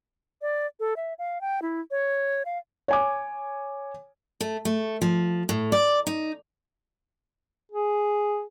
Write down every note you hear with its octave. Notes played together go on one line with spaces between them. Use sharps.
D5
A4
E5
F5
G5
E4
C#5
F5
C#5 G#5 D6
A3
A3
F3
A2
D5
D#4
G#4